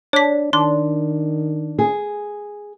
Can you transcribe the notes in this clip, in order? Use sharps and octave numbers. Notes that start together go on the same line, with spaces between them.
D4 C#5 B6
D#3 D4 C6
G#4